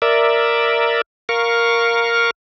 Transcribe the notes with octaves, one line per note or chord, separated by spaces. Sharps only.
A#4 D5 E5
A#4 F5 C#6